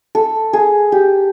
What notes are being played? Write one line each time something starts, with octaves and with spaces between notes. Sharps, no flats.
A4
G#4
G4